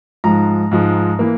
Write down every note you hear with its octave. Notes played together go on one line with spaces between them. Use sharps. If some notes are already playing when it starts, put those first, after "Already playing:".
G#2 F3 G#3 A#5
G#2 F3 G#3
E3 A#3